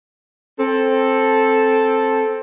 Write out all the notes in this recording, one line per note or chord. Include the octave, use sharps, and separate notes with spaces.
C4 A4